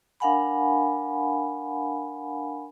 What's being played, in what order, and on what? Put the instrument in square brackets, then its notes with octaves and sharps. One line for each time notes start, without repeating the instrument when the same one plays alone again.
[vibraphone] D4 A#4 F5 F#5 G#5 B5